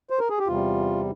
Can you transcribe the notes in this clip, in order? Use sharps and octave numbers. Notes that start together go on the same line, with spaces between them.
C5
A#4
G#4
G4
E2 C3 G3 F4